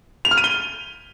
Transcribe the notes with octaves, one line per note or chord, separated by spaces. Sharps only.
F7
F6
D#7
G7